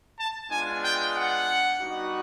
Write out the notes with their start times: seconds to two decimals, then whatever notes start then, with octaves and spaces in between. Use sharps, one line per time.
0.18 A5
0.49 G#3 B3 D4 F4 G#5
0.82 G5
1.14 F#5
1.79 G3 B3 D#4 F#4